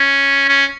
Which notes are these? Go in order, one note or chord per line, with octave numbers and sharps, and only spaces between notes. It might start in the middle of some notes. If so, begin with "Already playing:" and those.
Already playing: C#4
C#4